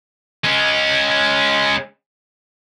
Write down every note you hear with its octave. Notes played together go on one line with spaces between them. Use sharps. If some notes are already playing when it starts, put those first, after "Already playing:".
G#3 C#4